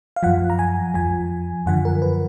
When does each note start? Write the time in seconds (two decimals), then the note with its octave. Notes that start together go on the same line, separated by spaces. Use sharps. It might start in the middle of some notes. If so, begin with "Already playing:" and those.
0.16 F5
0.23 F#2 F3 F#5
0.50 A#5
0.59 G#5
0.94 F2 F3 G#5
1.66 F#2 D3 F3 F#5
1.85 A#4
2.02 B4